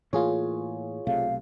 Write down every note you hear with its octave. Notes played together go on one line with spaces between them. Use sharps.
A2 E3 A#3 F4 G#4 C#5
B1 C3 A3 F5